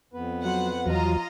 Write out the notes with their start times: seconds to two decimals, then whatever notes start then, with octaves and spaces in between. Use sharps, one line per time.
0.14 F2 B3 B4
0.44 F#3 C5 F#5
0.86 E2 F3 F#3 F4 D#5 A#5